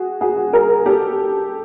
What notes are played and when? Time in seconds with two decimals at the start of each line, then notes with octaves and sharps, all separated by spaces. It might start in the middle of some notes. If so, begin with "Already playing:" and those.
Already playing: F#4 G#4
0.21 F#4 G#4
0.53 G#4 A#4
0.86 G4 A4